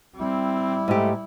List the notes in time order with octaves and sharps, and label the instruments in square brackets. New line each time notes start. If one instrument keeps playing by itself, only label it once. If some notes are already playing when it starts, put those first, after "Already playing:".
[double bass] G3 E4 [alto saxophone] C4
[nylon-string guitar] G#2 G4 [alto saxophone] A3